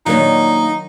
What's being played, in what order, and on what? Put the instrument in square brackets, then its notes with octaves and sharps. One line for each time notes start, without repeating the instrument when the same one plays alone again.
[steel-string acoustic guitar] A#2 A#3 D4 [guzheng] D#3 F#3 [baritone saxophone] D#4